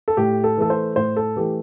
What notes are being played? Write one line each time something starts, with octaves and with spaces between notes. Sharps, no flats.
A4
A2 G4
A4
E3 A3 A4
C5
A2 C5
A4
E3 A3 G4